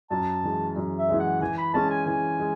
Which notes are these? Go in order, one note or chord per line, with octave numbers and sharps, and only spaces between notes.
F#2 A5
E3 G#3
F#2
E5
E3 G#3
F#5
E3 G#5
B5
G#3 C#4 A5
G#5
E3 G#5
G#3